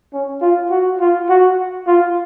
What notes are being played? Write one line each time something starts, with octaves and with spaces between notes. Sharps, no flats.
C#4
F4
F#4
F4
F#4
F4